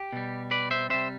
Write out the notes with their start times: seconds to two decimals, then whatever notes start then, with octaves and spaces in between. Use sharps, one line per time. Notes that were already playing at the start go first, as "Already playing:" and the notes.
Already playing: G4
0.12 B2 G3
0.51 B4 D5
0.71 C5 E5
0.90 C3 G3 C5 E5